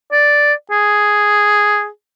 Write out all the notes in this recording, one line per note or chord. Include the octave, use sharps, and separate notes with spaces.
D5
G#4